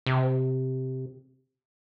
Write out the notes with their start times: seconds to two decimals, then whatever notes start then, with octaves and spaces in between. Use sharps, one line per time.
0.06 C3